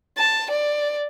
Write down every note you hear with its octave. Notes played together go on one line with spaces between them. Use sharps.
A5
D5